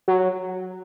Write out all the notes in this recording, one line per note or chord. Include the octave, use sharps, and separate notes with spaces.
F#3